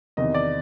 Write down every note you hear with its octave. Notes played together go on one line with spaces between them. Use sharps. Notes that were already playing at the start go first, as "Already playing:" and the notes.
E2 C3 D#3 D#5
D5